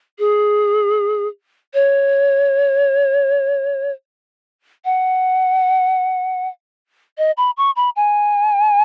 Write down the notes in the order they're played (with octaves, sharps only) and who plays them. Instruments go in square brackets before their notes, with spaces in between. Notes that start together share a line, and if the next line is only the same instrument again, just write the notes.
[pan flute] G#4
C#5
F#5
D#5
B5
C#6
B5
G#5